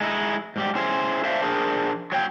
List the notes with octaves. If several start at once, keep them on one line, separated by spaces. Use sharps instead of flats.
G#3 D#4 E4
G#2 G3 G4
C#4 E4 G#4 C5
D4 C5 E5 F5
D4 G#4 A#4 C5
F#3 C#5 G5